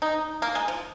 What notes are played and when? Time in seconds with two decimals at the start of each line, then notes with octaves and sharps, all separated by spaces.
0.02 D#4
0.42 A#3
0.55 G#3
0.68 F3